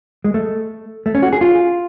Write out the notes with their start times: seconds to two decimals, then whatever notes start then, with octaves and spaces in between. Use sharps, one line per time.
0.24 G#3
0.34 A3
1.06 A3
1.15 C#4
1.23 F#4
1.33 G#4
1.41 F4